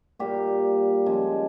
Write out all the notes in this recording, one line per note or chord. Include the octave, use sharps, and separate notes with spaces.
A#2 G3 A#3 G4
C#3 F3 G#3